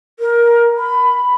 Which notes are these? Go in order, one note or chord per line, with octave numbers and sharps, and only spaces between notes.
A#4
B5